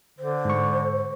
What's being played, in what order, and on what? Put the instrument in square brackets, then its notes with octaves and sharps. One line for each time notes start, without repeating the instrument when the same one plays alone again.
[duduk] D3 [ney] C5
[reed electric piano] G#2 C#6